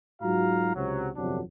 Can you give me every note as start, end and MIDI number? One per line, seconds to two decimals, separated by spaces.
0.22 0.73 44
0.22 0.73 54
0.22 0.73 65
0.22 0.73 66
0.22 0.73 77
0.22 0.73 82
0.76 1.09 37
0.76 1.09 48
0.76 1.09 54
1.16 1.41 31
1.16 1.41 41
1.16 1.41 48
1.16 1.41 54
1.16 1.41 62